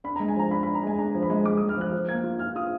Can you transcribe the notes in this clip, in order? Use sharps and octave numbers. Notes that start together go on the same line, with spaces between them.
D4 B5
G#3 A#5
G#5
F3 A#5
D4 B5
D4 B5
A#5
G#3 G#5
D4 A#5
F3
B5
G#3
G#3 D6
G#3 D#6
F6
F3 F#6
F3
A#3 G#6
F4
F4 F6
F4 D#6